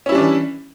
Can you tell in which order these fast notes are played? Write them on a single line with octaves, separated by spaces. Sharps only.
C#4 E4 G3 D4 E3